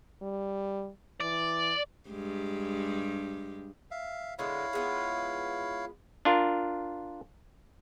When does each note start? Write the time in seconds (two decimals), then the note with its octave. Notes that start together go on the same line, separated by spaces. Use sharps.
0.22 G3
1.20 E3 D5
2.08 G2 G#3 G4
3.91 E5 F5
4.39 D3 G#3 B3 E4 C#5 F5
4.73 G#3 B3 F4
6.25 D4 F4 A#4